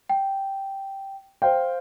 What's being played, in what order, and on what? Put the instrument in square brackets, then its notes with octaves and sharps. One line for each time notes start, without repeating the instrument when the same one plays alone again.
[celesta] G5
[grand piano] C5 F5 G5